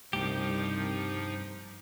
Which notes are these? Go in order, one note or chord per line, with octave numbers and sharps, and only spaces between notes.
C2 G2 F3 A3 D#4 G4